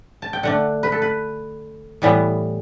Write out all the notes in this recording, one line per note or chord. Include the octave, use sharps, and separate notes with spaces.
A5
G5
D3 A3 D4 F#5
B4
A4
B4
A2 E3 G3 B3